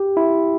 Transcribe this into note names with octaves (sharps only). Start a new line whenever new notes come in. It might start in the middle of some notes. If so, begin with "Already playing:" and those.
Already playing: G4
E4